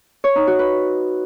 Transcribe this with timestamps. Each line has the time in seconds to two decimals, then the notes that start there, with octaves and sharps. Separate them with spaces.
0.24 C#5
0.36 D#4
0.47 F#4
0.59 B4